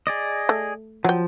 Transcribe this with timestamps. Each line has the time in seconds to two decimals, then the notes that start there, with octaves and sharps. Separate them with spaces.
0.07 G#4 D5 D#5
0.49 A3
1.04 F3 F#3 G5